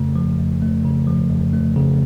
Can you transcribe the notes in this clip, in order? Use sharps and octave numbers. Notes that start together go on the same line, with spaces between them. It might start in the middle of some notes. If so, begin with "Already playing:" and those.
Already playing: F2 C#3 A3
F3
F2
A3
C#3
F3
F2
A3
C#3